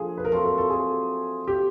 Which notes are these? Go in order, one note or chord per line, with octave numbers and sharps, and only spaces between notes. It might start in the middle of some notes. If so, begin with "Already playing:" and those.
Already playing: D3 F3 A#3 D4 G#4
B4
A#4
F#3 A3 C4 F4 A4
A#4
A4
G#4
G4